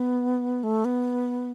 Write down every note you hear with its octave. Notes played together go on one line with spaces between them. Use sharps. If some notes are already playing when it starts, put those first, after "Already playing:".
Already playing: B3
A3
B3